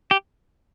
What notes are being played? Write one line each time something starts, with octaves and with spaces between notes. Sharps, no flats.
G4